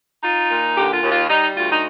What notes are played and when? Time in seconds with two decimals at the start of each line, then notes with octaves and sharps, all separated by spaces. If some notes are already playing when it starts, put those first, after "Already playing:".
0.23 D#4 F4
0.50 A#2
0.76 D3 G4
0.93 F4
1.02 D#2
1.10 F4
1.28 G3 D#4
1.55 D2 F4
1.71 D#4